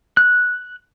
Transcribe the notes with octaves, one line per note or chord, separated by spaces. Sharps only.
F#6